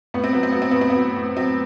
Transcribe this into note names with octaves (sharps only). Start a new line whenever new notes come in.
A2 B3
C4
F#3 B3
C4
F#3 B3
C4
A2 B3
C4
B3
F#3
A2
F#3 C4